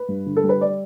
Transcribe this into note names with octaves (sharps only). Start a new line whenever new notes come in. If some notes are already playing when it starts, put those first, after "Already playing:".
Already playing: B4
G2
D3
A4
G3
B4
D5